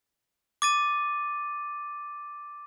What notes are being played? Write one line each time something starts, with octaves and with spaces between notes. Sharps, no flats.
D6 A6 D#7